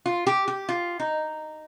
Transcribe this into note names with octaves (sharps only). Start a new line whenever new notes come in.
F4
G4
G4
F4
D#4